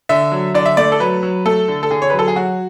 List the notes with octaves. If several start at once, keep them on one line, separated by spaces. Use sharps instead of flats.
D3 E5
F#3
D3 D5
E5
A3 D5
A4
F#3 B4
F#3
A3 A4
D3
A4
D3 G#4
C#5
F#3 B4
A4
G#4
F#3 F#4